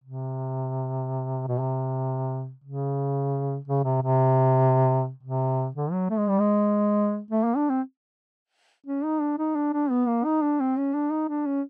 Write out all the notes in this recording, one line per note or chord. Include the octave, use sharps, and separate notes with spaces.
C3
B2
C3
C#3
C#3
C3
C3
C3
D3
F#3
A3
G#3
G3
G#3
A3
A#3
D4
C4
C#4
D#4
D4
D#4
D4
D4
B3
A#3
D#4
D4
C4
C#4
D4
D#4
D4
C#4